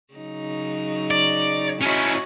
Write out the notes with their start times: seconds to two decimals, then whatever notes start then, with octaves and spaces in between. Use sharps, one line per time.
0.14 C#3 F#3 D#4
1.11 D5
1.82 C#4 E4 F#4 C#5 D#5